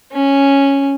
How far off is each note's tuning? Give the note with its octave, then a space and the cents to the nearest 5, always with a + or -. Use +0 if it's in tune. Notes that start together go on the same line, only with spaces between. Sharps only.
C#4 -5